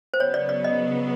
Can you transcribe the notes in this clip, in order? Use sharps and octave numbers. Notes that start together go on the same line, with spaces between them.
C5
C#3 F#3 B3 C#5
D5
D5
D#5